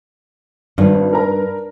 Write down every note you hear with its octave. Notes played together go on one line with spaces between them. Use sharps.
G#1 G2
A#4 B4 A#5